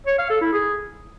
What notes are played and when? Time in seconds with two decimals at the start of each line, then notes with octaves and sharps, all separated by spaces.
0.07 C#5
0.18 F5
0.30 A4
0.41 E4
0.53 G#4